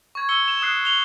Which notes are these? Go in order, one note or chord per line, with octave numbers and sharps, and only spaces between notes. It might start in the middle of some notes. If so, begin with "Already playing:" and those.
C#6 G#6
C#6 E6 C#7 G7
E7
D#6 F#6 C7
F7 G7